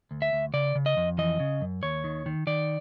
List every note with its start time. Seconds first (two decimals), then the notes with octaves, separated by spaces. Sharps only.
0.11 D2
0.22 E5
0.33 D2
0.53 C#3 D5
0.75 C#3
0.86 D#5
0.97 F2
1.18 E3 D#5
1.40 C#3
1.61 F#2
1.83 D#2 C#5
2.04 D#3
2.26 D#3
2.47 D#3 D5